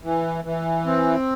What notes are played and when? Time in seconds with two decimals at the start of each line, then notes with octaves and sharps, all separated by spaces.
0.03 E3
0.44 E3
0.86 C4